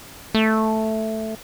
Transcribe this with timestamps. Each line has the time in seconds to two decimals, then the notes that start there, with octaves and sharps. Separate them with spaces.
0.34 A3